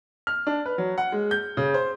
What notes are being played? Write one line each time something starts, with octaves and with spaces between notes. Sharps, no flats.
F6
D4
B4
F#3
F#5
G#3
G6
C#3
C5